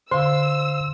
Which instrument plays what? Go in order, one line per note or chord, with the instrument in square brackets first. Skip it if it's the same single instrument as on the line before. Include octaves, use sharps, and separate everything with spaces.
[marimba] D3 [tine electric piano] C5 F5 [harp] C6 [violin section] E6